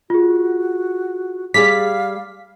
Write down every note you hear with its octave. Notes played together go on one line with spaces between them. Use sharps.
F4 F#4 G#4
G3 G#4 D5 F5 D6 B6